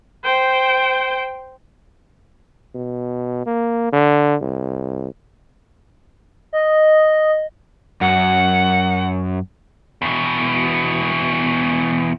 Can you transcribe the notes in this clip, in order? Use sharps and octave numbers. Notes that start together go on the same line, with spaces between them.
C5 G5
B2
A#3
D3
C2
D#5
F#2 F#5
E2 B2